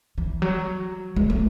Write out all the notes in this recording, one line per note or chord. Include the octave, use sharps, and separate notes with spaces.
E3
F#3
G#3
A3